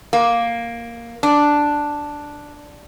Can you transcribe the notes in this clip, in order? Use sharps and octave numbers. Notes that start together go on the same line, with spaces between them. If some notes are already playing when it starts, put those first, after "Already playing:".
A#3
D4